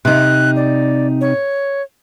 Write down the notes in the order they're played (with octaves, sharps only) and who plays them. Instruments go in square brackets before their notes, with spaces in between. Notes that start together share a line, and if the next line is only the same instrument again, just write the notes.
[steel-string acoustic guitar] C3 D#4 [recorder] F#6
[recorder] D5
C#5